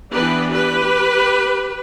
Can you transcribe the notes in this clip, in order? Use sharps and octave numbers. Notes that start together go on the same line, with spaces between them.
E3 B3 D4 G4 B4
G4 B4